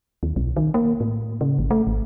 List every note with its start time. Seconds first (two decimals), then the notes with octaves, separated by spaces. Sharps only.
0.23 D#2
0.36 B1
0.56 D#3
0.74 A#3
1.01 A2
1.41 C#3
1.59 G#1
1.71 A3
1.87 G#1